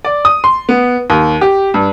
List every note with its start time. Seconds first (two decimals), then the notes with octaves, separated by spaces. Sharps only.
0.05 D5
0.25 D#6
0.44 C6
0.69 B3
1.10 D#2
1.41 G4
1.74 G2